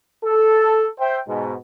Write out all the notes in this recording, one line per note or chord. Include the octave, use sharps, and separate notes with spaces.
A4
C5 E5 G5
G#2 B2